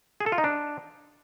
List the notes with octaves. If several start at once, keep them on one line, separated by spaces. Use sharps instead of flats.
G#4
A4
F4
D#4
D4